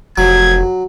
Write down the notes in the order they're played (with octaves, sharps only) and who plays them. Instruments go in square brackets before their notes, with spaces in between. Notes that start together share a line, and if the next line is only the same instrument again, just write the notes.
[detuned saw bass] F1 [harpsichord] F#3 [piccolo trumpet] G#6